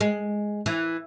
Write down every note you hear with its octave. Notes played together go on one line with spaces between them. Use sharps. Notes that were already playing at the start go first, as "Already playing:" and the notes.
G#3
E3